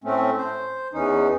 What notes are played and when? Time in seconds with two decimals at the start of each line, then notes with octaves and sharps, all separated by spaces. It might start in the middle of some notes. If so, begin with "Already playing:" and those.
0.04 A2 A3 C4 C#4
0.38 C5
0.94 E2 E3 C#4 D#4